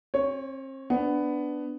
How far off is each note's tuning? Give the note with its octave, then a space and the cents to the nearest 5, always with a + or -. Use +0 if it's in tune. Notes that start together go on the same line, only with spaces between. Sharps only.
C4 +40 C#5 +0
B3 +10 D4 +0